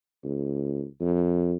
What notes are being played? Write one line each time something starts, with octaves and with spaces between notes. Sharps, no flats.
C#2
F2